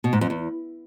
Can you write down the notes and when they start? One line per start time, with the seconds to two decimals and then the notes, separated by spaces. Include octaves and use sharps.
0.04 B2
0.13 G#2
0.21 F2
0.30 E2